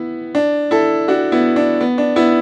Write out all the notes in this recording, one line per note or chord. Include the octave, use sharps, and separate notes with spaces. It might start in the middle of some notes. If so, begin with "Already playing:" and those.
Already playing: B3 E4
D4
E4 A4
D4 F#4
B3 E4
D4
B3
D4
B3 E4